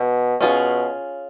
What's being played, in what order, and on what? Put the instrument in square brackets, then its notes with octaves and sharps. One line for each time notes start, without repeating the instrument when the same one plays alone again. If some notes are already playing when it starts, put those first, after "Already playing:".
Already playing: [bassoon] B2
[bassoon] B2 [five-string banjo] C#4 F4 G#4